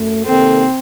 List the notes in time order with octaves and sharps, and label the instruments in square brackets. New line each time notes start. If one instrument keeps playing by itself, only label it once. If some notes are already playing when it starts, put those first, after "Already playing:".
Already playing: [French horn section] F#2 A3
[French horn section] C3 D#3 A#3 D#4 A4 [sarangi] C4